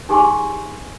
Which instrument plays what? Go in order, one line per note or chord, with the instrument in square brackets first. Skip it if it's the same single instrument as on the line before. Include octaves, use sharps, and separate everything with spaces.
[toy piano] D#4 G4 G#4 G#5 C6 C#6